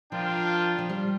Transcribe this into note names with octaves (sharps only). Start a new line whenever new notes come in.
F3 D4 F4 A#4 G5
F3
G3